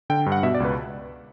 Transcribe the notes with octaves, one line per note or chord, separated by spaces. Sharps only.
D3 G5
G2
F#5
B2 E5
D5
C#2 B4